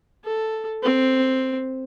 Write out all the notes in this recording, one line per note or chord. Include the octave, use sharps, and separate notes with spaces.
A4
C4